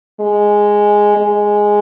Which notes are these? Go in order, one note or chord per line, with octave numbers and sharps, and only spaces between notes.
G#3
G#3